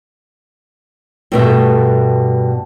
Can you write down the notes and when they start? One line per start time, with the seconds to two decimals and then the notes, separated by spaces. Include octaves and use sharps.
1.32 G2 B2 A3